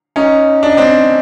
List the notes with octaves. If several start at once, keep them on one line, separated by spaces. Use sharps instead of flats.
C#4 D#4
D4
D#4
C4 D4